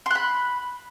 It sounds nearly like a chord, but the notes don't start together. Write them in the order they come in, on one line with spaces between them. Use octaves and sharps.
C6 F#6 B5